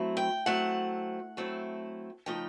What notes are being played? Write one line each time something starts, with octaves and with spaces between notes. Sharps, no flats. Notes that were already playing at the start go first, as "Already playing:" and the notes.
Already playing: F#3 A3 C4 E4
G5
F#3 A3 C4 E4 F#5
F#3 A3 C4 E4
C#3 F3 A3 D#4 G5